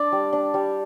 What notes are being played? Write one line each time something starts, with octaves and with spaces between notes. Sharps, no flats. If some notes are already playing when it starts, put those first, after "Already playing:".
Already playing: D4 D5
G3
D4
G3